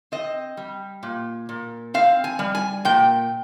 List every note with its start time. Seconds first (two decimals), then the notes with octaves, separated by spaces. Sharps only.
0.12 C4 D#5
0.57 G3
1.03 A#2
1.49 A#2
1.94 C4 F5
2.24 G#5
2.39 G3
2.55 G#5
2.85 A#2 G5